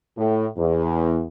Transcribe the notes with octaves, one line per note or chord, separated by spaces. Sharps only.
A2
E2